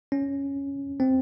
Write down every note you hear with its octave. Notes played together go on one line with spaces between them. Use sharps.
C#4
C4